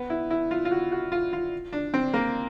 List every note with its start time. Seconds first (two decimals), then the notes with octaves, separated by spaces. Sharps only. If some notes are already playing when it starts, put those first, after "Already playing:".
Already playing: B3
0.10 E4
0.30 E4
0.51 F4
0.65 F4
0.71 F#4
0.92 F#4
1.12 F4
1.33 F4
1.73 D4
1.94 C4
2.14 A#3